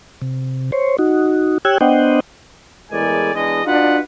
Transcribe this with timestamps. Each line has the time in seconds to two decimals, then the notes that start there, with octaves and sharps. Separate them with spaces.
0.22 C3
0.72 C5 C#5
0.99 D#4 F#4
1.65 G4 C#5 G5 E6 F#6 G#6
1.81 B3 D4 C5 D#5 F#5 G5
2.91 E2 A2 G#3 A#4 D5 G#5
3.34 E2 G#3 B3 D4 D#5
3.65 D4 D#4 F4 F#4 B4 F#5